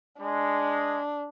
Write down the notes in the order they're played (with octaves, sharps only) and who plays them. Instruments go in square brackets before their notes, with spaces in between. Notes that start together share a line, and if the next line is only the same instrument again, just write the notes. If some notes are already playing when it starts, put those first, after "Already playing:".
[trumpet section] G#3 [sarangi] D4